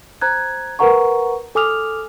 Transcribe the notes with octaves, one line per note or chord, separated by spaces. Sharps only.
C5 A#5 F#6 G#6
A#4 B4 F#5 A#5 C#6
A4 G#5 D6 D#6 F6 F7